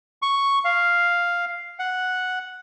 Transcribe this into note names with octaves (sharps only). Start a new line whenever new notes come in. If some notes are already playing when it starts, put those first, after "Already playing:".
C#6
F5
F#5